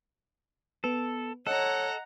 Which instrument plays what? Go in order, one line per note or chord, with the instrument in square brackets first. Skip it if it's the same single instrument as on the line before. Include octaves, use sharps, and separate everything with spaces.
[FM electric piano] B3 B4 [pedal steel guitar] A4
[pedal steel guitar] A4 [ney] C#5 [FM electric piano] D#5 [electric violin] F#5 A#5